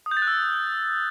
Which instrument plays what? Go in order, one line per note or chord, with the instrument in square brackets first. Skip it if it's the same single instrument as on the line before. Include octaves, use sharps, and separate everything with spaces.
[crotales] D#6
G6
A6
F#6
E6